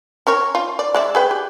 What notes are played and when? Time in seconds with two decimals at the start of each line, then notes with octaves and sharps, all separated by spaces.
0.27 C#4 A#4 C#5
0.55 F4
0.79 D5
0.94 G#3 D5 E5
1.15 G#4 B4 G5
1.31 G4